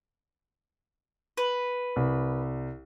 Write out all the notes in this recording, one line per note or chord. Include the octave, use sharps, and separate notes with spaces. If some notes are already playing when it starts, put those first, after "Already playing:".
B4
C2